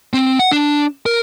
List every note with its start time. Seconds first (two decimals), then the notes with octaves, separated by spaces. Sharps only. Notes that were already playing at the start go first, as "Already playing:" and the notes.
0.14 C4
0.39 F#5
0.51 D4
1.06 A#4